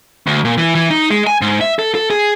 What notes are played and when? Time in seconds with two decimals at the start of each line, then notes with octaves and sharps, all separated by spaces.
0.27 D2
0.45 A#2
0.58 E3
0.75 E3
0.90 D#4
1.11 G#3
1.27 G#5
1.41 G#2
1.61 E5
1.79 A4
1.95 A4
2.10 G#4